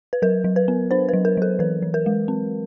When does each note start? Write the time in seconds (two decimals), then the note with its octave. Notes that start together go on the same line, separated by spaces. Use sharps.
0.13 B4
0.22 F#3 A#4
0.44 F#3
0.56 B4
0.68 B3
0.91 D4 C5
1.09 F#3 B4
1.25 A#4
1.37 F#3 A4
1.59 E3 B4
1.82 E3
1.94 A#4
2.06 G#3
2.28 C4